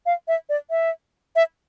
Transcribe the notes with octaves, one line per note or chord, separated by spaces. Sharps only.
F5
E5
D5
E5
E5